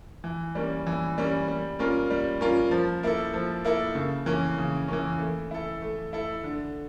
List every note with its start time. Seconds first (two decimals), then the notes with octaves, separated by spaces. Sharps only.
0.24 E3
0.55 G3 A#3 C#4
0.87 E3
1.18 G3 A#3 C#4
1.48 G3
1.79 A#3 C#4 F4 A#4
2.10 G3
2.41 A#3 C#4 F4 A#4
2.71 F3
3.03 A#3 E4 A4
3.34 F3
3.65 A#3 E4 A4
3.95 C#3
4.26 E3 A#3 C#4
4.58 C#3
4.88 E3 A#3 C#4
5.19 A3
5.51 E4 A4
5.82 A3
6.13 E4 A4
6.44 D3